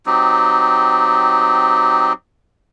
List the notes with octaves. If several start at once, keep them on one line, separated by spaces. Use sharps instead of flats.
F#3 C4 D#4 G4